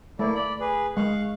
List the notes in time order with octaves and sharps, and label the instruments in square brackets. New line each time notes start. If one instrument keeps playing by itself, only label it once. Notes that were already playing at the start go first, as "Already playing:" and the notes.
[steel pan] A3 [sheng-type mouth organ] A#3 E4 D5
[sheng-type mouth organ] D5 B5
G#4 B4
[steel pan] G#3 [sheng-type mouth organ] F5 C#6 F#6